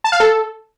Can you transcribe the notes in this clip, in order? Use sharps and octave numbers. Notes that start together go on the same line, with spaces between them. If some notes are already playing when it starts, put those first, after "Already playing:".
A5
F5
A4